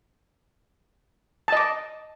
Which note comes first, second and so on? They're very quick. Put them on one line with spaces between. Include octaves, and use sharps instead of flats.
A5 D#5 D6